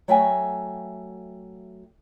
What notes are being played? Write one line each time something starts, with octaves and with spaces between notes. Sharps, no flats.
F#3 A3 F#4 E5 G5 G#5